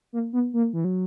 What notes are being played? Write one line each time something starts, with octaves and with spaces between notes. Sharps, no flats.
A#3
B3
A#3
E3
F#3